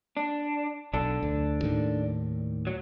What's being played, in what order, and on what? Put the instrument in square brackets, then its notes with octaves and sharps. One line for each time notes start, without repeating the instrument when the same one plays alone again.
[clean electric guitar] D4
[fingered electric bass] B1 [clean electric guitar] D4 A4
[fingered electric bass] D2
D#2 A2 D#3
[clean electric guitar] F#3